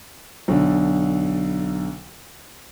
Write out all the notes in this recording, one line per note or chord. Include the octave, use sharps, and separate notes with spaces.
B1 D3